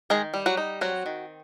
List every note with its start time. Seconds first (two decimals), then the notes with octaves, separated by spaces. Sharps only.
0.10 D#3 G#3 G#4
0.34 G3
0.46 F#3 F#4
0.57 D#4
0.81 F#3 C4 F#4
1.06 D#3